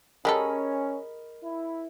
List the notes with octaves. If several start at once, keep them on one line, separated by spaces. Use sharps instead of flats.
G#3 C#4 G4 A4 A#4 D#5 B5
E4